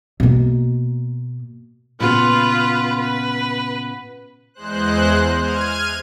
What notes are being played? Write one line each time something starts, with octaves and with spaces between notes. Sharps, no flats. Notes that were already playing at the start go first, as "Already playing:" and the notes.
B2 A#3
A#2 C#3 B3 F4 B4
B4
E2 G#3 C5 F#6
F6 G#6 D#7